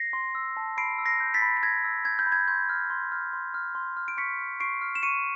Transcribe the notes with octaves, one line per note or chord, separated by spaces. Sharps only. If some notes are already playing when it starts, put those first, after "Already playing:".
Already playing: A#6 C7
C6
E6
A5
B5 C7 D7
E6
A#6 C7
G6
A6 B6
B5
B6
B5 G#6 A#6
E6
G6 G#6
G6
B5
G#6
C6 G6
F6
C6
F6
C6
F6
C6
F6
D7
C#6 B6 C#7
F6
C#6 C7 D7
F6
E7
C#6 C#7 D#7